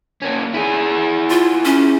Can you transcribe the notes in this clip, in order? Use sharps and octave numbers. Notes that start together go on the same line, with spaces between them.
A#3 C#4
E4 G#4
F4
C#4